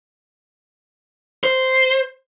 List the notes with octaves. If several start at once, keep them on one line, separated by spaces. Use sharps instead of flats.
C5